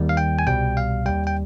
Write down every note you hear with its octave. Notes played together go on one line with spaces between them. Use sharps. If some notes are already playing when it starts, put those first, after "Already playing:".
Already playing: D#2 D#3 G3
F5
G5
G#5
C2 B2 G3 G5
F5
D#2 D#3 G3 G5
G5